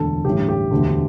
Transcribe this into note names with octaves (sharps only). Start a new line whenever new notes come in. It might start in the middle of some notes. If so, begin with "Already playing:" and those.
Already playing: E1 D2 D3 A4
A1 G2 D3 G4
G4
E1 D2 D3